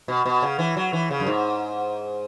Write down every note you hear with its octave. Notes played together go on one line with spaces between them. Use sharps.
B2
B2
C#3
E3
F#3
E3
C#3
F#2
G#2